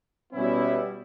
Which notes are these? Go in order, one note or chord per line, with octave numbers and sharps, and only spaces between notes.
B2 G3 B3 C#4 E4